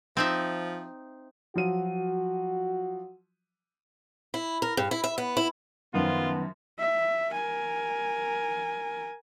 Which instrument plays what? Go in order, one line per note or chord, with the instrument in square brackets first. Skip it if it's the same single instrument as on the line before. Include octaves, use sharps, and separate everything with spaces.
[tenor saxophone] F3 [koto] C4 D#4 E5
[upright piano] F3 F#3 D#7 [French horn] F#4
[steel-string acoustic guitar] E4
A#4
G2
E4
E5
B3
E4
[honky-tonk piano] F#2 F3 [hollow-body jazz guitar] D#3 [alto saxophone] B3 [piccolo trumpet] F4
[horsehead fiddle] E5
A#4 G#5